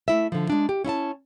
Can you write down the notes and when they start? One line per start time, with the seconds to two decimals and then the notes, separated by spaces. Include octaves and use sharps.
0.08 A3 E4 E5
0.32 D3 F3
0.50 G#3 D4
0.69 G4
0.84 C#4 E4 E5 A5